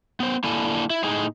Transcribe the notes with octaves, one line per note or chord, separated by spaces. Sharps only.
B3 C5
D3 A#3 E4 A4 D5 G#5
E4
A2 D#4 G#4